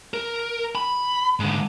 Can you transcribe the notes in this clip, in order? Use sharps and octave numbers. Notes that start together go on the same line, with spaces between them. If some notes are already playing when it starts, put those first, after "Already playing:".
A#4
B5
G#2 D3